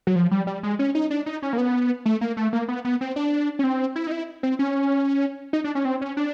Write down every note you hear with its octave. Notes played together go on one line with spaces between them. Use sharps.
F#3
F3
G3
G3
G#3
C#4
D#4
D4
D#4
C#4
A#3
B3
A3
A#3
A3
A#3
B3
B3
C4
D4
C#4
C4
E4
D#4
E4
C4
C#4
D#4
D4
C#4
C4
C#4
D4